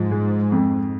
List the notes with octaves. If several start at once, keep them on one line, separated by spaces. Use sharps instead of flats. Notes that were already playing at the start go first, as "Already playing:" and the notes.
Already playing: G#2 F3
G#3
F2